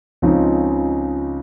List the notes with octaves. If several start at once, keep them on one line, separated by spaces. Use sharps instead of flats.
C#2 C#3 F3 C4 D#4